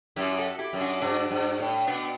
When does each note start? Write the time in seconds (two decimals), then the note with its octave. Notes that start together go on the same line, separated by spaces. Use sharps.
0.16 F#2 E4 G4
0.38 F#4 A4
0.59 E4 G4
0.73 F#2
0.81 D4 F#4
1.01 G2 D4 F#4
1.31 G2
1.59 A2
1.87 B2 B3 D4